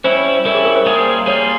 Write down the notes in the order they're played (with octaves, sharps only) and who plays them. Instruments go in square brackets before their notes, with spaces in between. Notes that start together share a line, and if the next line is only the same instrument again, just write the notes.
[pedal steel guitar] G3 C#4 E4 [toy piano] C5
[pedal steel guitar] G3 C#4 E4 [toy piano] A#4
[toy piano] G#4
A#4
C5
[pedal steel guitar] G3 A#3 F4 G#4
[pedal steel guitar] G3 A#3 F4 G#4 [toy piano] C#5